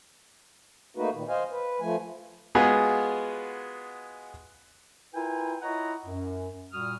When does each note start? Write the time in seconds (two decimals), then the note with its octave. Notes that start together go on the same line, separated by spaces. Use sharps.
0.97 A3 A#3 D#4 F#4 B4
1.14 A#2 D#3
1.29 C5 D#5 F5 G#5
1.51 B4
1.80 F3 A3 G#5
2.55 G#3 B3 F4 F#4 G#4
5.14 E4 F4 A#4 B4 G5 G#5
5.62 E4 F4 C#5 D#5 F#5 A#5
6.05 F#2
6.72 A#2 G3 F#4 D#6 F6